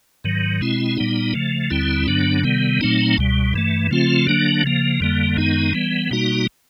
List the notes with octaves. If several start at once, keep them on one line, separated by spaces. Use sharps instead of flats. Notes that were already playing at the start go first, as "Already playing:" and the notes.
G#2 D#3 F#3
B2 G#3 C4 E4
A#2 G3 B3 D#4
C#3 F3 A3
D#2 D3 G3 C4 E4
G2 D3 F#3 B3 D4
C3 D#3 G3 B3
A#2 F#3 A3 C4 D#4
C#2 B2 G3
G2 E3 A3
C#3 F3 A3 C4 F4
D3 F#3 A#3 D4
C#3 F3 A#3
F2 D3 G3 A#3
F#2 D#3 G#3 B3 D#4
E3 G3 B3
B2 G3 A#3 D#4 F#4